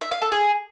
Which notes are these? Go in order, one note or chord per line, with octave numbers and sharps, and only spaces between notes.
E5
F5
A4
G#4